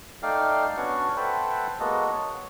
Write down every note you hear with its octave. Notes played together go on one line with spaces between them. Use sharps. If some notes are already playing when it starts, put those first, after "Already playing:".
A3 D#4 D5 F5 G5 F6
B3 C#4 D4 F#4 C#6
A4 B4 C5 E5 F#5 G5
G#3 A#3 B3 F#4 A4 D#5
C#5